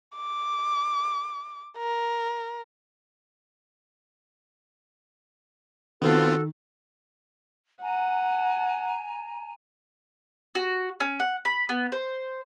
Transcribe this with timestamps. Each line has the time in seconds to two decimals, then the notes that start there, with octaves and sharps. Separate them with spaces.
0.16 D6
1.77 A#4
6.02 D#3 B3 C4 F4 F#4 A4
7.83 F#5 G#5 A#5
10.55 F#4
11.00 C#4
11.20 F#5
11.45 B5
11.69 B3
11.92 C5